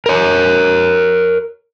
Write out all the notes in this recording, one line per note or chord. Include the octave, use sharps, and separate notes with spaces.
A#4 C#5